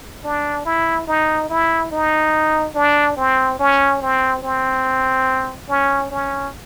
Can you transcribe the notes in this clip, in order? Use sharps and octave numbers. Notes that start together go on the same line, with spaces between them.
D4
E4
D#4
E4
D#4
D4
C4
C#4
C4
C4
C#4
C#4